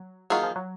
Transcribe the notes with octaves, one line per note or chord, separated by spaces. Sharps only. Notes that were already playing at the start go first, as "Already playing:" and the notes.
Already playing: F#3
D#3 F#3 A#3 F4 G#4
F3
F#3